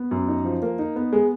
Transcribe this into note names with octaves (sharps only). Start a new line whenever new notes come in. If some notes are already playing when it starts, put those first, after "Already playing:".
Already playing: B3
F#2
D#4
F3
A#3
D#4
B3
G#3